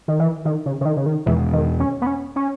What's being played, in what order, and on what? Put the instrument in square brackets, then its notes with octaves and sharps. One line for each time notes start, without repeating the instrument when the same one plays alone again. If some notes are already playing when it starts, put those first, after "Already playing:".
[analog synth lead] D#3
E3
D#3
C#3
C#3
D#3
C#3
D#3
[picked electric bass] E2 B2 G#3 [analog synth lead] E3
[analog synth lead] D#3
C#4
B3
C#4
C#4